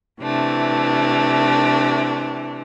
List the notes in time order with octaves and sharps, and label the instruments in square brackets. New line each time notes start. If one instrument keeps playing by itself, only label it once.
[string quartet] C3 E3 A3 D4